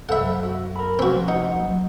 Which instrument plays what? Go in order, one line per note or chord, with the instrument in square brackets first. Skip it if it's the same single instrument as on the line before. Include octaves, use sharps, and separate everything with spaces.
[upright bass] F#2 [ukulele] A4 C5 B5 [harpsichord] E5 F#5
[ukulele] F#4
A#4 B5
[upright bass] F3 [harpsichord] C4 F#4 [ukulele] C#4
[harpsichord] D#4 [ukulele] F#5
[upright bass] F#3 A#3